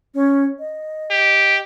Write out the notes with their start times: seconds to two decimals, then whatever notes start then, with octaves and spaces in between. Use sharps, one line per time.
0.14 C#4 C#5
0.58 D#5
1.11 G4